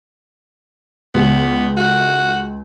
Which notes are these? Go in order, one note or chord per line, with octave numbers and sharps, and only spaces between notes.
C#2 B3
F#4